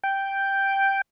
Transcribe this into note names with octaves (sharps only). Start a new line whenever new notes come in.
G5